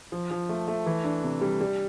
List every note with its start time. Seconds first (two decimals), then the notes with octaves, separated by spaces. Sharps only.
0.12 F3
0.31 F3
0.49 A3
0.68 A3
0.86 E3
1.04 D4
1.24 C3
1.41 G3
1.61 G3